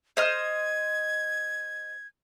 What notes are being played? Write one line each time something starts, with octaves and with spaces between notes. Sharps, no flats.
C5 D#5 F6 G#6